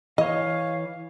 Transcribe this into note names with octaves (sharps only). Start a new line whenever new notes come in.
E3 C#5 D#5 F5